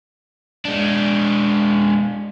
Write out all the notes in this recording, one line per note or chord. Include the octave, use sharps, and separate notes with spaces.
G#3 D4